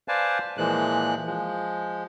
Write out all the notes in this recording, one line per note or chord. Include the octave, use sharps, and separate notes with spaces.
B4 C5 D5 F5 G#5 A5
A#2 E3 F3 G#3 F#6
F3 G#3